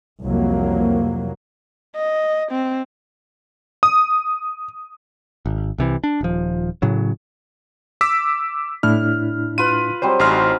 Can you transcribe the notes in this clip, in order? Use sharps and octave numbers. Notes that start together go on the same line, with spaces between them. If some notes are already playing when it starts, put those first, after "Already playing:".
C2 F2 F#3 A#3
D#5
C4
D#6
G#1
C2 C3 E3
D4
D#1 F3
A2 C#3 F#3
D6 E6 B6
A2 D4 E4 F6
F4 B4 D#7
F#3 G3 C4 C5
A1 D#4 F#4 G#4 C6 F6